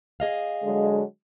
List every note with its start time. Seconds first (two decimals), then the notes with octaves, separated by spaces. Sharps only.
0.20 G#4 D#5 F5
0.62 D3 F#3 G#3